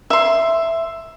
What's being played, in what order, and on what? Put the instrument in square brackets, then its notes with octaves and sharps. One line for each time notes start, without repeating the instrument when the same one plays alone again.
[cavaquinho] E5 C6